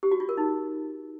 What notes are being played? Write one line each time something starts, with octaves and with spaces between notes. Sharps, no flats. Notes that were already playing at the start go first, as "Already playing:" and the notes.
G4
F#4
F4
A#4
D#4